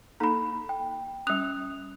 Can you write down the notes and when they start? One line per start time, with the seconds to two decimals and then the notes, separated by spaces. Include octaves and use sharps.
0.20 A#3 D#4 A4 A#5 B5
0.69 G5
1.27 G3 C#4 D#6 F#6 F7